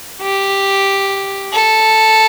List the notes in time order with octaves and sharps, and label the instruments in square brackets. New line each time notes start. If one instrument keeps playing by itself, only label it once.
[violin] G4
A4